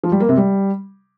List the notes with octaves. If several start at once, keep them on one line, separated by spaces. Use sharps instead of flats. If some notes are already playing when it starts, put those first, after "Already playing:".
F3
G3
A#3
C3
G3